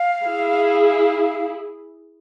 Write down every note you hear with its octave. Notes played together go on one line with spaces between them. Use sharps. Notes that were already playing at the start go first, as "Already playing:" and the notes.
Already playing: F5
E4 G#4